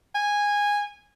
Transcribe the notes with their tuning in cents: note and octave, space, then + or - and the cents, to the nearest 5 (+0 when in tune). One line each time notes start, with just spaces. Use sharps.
G#5 -15